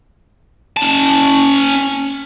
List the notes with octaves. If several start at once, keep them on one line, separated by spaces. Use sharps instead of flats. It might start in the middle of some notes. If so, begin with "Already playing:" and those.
C#4 A5